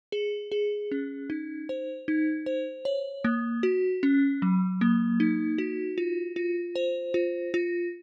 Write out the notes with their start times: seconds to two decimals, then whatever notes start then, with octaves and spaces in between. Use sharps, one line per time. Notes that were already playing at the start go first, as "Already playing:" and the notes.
0.12 G#4
0.52 G#4
0.92 C#4
1.30 D#4
1.69 C5
2.08 D#4
2.46 C5
2.85 C#5
3.24 A#3
3.63 F#4
4.03 C#4
4.42 F#3
4.81 A#3
5.20 D#4
5.58 F#4
5.98 F4
6.36 F4
6.76 C5
7.14 F4
7.54 F4